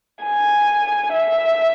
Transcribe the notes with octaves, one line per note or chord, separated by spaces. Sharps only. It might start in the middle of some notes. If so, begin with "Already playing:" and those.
G#5
E5